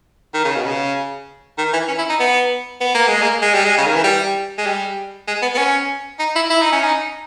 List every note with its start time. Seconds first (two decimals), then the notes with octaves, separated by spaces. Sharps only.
0.34 D#3
0.45 C#3
0.56 B2
0.66 C#3
1.58 D#3
1.73 E3
1.88 C#4
1.98 E4
2.10 D#4
2.20 B3
2.81 B3
2.95 A#3
3.07 G#3
3.22 A#3
3.42 G#3
3.54 G3
3.66 G#3
3.78 C#3
3.86 D#3
3.96 E3
4.04 G3
4.58 G#3
4.66 G3
5.28 G#3
5.42 B3
5.55 B3
5.58 C#4
6.19 D#4
6.36 E4
6.50 E4
6.62 D#4
6.72 C#4
6.83 D#4